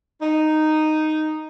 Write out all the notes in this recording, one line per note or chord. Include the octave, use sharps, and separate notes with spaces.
D#4